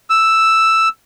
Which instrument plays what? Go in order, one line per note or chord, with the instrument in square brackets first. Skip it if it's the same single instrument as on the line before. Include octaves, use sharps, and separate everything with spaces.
[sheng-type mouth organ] E6